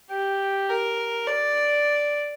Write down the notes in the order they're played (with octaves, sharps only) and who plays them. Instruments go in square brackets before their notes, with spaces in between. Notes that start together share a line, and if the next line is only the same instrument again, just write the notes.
[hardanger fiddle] G4
A#4
D5